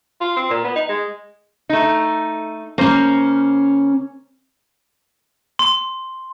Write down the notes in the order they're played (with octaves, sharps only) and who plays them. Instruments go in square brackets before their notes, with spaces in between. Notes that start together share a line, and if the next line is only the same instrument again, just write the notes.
[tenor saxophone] F4
C4
A#2
B3
D#4
G#3
[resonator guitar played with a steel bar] A3 D#4
[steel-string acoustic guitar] C#3 C#4 [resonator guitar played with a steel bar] A#3 C5
[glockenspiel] C6